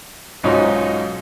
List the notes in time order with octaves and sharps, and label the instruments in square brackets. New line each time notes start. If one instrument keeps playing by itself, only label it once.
[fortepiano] B1 G#2 C#4 D#4 F4 F#4